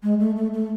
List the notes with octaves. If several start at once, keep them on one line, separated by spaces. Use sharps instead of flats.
G#3
A3
A3
A3